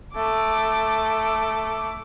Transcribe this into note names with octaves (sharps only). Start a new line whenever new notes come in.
A3 D6